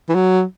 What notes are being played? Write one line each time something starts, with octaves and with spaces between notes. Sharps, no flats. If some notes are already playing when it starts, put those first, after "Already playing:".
E3
F#3